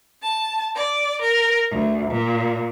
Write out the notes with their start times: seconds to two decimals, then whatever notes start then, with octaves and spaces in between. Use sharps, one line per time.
0.23 A5
0.76 D5
1.22 A#4
1.70 D2
2.10 A#2